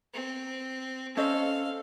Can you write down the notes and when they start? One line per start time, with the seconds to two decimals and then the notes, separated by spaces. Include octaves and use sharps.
0.14 C4
1.17 C#4 A4 C5 D#5 F5